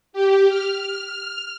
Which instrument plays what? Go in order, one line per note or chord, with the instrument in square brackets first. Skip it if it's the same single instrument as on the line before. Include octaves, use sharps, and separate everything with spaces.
[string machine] G4
F6